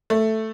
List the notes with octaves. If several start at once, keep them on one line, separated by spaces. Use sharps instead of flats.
A3